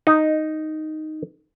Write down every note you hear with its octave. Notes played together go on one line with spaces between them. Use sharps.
D#4